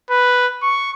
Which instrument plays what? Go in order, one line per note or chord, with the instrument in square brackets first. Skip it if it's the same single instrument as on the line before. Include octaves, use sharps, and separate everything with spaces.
[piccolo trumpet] B4
C#6